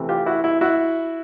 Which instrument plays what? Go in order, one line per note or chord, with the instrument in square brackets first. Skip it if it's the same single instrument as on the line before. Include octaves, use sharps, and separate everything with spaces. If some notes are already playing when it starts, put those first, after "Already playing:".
Already playing: [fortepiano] C3 E3 A3 C4
F4 G4
E4 F#4
E4
E4 F#4